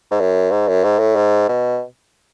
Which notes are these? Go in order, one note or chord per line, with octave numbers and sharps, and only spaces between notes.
G#2
F#2
G#2
F#2
G#2
A2
G#2
B2